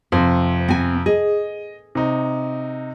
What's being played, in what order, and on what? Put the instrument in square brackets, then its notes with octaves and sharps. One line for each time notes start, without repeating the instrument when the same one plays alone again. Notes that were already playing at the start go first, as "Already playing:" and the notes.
[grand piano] F2 C3 [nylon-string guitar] C5
[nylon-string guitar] C4 G#5
[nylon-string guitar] G#4 [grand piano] D#5
[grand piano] C3 D#4